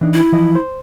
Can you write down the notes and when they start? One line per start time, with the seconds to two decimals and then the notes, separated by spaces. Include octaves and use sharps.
0.01 E3 D4 D#4
0.14 E4
0.32 E3 F3 D#5
0.55 C5